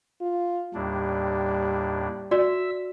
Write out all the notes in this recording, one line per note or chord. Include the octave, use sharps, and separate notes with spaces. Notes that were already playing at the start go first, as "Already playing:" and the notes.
F4
D#2 A2 G3 D4
F#4 D5 E5 E6